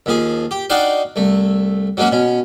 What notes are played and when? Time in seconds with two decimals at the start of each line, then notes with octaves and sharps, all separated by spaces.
0.06 D#2 F3 G#4
0.51 G4
0.70 D4 D#4 F#4 D5 F5 G5
1.16 C2 A3
1.97 F#3 G#3 A#3 C#4 F#4
2.12 B2 C#4